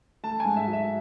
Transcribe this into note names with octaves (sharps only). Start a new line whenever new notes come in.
A3 A5
G#2 G#5
E5
F#3
E5